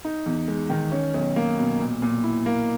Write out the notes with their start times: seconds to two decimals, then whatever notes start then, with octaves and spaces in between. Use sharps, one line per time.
0.05 D#4
0.26 E2
0.48 G#3
0.70 D#3
0.92 C#4
1.14 B1
1.36 A#3
1.58 B2
1.80 A#2
2.02 A#2
2.24 E4
2.46 A#3